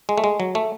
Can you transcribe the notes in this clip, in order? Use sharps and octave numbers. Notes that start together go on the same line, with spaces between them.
G#3
A3
G#3
F#3
A3